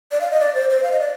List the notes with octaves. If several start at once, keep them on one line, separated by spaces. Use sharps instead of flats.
D5
F5
D#5
D5
C5
C5
F5
D#5
D5